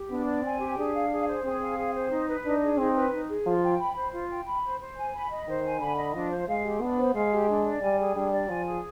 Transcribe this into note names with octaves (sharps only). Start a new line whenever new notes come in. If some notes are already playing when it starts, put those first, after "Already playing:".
Already playing: G4
B3 D4
D5
C4 G#5
G4
D4 G#4
F5
G#4
C5
C4 G#4
F5
G#4
C5
D#4
B4
D4 D#4
G#4
C4 D#4
B4
D#4
G#4
F3 F4
G5
B5
C5
F4
G5
B5
C5
C5
G#5
B5
D#5
D#3 C5
G#5
D3 B5
D#5
F3 D4
C5
G#3 F5
G4
B3 D4
C5
G#3 F5
G4
D4
D5
G3 G#5
G#4
G3 D4
D5
F3 G#5
G#4